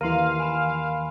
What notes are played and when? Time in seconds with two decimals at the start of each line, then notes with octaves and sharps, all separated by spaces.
0.01 D#2 E3 A#4 F5 C6 D#7
0.40 G#5 B5 E7